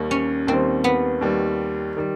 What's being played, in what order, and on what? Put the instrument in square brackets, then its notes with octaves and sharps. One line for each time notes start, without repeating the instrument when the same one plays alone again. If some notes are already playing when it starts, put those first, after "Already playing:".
Already playing: [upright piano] D#2 D#3 G3
[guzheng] C#4
[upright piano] D#2 D#3 G3 [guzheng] C4
[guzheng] B3
[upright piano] D#2 D#3 G3
D#3 G3